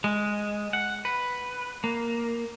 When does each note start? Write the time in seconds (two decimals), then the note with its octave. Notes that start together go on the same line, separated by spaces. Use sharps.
0.04 G#3
0.73 F#5
1.05 B4
1.84 A#3